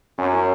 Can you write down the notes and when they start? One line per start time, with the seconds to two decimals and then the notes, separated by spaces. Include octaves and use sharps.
0.18 F#2 C#4
0.33 E4 C#5